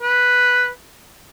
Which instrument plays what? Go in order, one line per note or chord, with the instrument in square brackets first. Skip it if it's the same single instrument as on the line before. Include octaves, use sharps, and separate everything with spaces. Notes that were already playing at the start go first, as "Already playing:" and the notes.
[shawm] B4